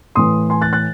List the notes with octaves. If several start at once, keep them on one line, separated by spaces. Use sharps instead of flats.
A2 E3 C6 D#6
G#5 C6
F#6 A6
F#6 A6